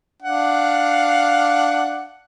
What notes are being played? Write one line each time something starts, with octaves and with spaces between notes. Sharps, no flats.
D4 F5 F#5